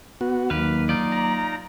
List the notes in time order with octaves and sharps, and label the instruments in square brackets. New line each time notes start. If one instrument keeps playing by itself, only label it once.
[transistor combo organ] B3 F#4
[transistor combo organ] D#2 [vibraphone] F#3 A#3 D6 [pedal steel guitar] B4 F5
[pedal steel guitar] D#4 F4 D5
[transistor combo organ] A#5